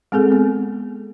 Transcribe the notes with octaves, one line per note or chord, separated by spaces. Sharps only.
G#3 C4 G#4 A4
B3